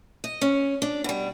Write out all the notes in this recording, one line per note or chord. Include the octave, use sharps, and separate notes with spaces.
D#5
C#4
D4
B2 G3